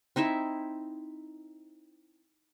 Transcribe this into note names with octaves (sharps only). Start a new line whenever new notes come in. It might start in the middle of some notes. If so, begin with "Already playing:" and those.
C4 D#4 E4 E5